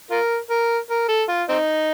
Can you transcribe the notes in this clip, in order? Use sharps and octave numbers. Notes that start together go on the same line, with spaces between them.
F4 A#4
A#4
A#4
A4
F4
C4 D#4